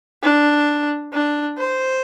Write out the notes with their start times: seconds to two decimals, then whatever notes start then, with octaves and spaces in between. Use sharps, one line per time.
0.23 D4
1.13 D4
1.58 C5